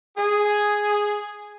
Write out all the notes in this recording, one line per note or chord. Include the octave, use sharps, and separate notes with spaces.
G#4